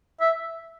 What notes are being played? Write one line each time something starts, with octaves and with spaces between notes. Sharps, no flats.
E5